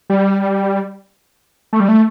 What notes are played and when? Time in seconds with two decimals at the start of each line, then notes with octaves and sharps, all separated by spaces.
0.10 G3
1.73 A3
1.80 G3
1.89 A3